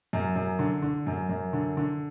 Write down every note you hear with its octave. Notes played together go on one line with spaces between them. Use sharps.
F#2
F#2
D3
D3
F#2
F#2
D3
D3